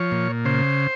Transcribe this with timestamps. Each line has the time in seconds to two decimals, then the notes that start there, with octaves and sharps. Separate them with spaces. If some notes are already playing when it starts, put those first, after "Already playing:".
Already playing: F3 C#5
0.12 A#2
0.45 C#3 C5